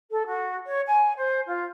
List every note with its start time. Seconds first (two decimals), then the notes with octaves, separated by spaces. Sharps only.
0.11 A4
0.26 F#4
0.66 C#5
0.86 G#5
1.16 C5
1.46 F4